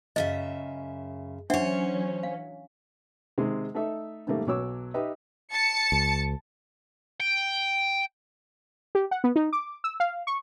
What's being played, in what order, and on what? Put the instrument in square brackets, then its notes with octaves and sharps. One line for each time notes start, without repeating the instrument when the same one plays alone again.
[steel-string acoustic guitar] F#2 C#3 E5 [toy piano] D#5
[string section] E3 F#3 C#4 [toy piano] D4 E5 F#5 [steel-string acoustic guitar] C5 C#5
[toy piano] F5
[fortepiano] C3 D#3 G#3
A3 D#4 A4 E5
G#2 D#3 G3 A3 A#3
B1 F#3 C#5 D6 E6
D#4 G4 B4 D#5 E5
[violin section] A5 C#7
[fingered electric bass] C#2
[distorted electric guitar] G5
[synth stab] G4
F#5
B3
D#4
D6
E6
F5
C#6